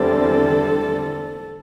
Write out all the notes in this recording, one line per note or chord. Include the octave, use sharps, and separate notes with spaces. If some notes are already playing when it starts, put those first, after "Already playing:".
Already playing: E2 D3 G3 C4 A4